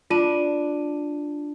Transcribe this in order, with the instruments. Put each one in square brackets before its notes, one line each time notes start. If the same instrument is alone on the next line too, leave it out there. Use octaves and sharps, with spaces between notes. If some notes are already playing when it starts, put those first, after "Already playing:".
[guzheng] D4 [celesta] F4 D#7